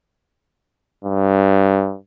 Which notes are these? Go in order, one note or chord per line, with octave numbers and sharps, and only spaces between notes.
G2